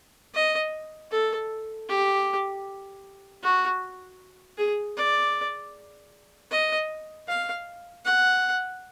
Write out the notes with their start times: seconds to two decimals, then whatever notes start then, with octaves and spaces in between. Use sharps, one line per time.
0.34 D#5
1.11 A4
1.89 G4
3.43 F#4
4.58 G#4
4.97 D5
6.51 D#5
7.28 F5
8.05 F#5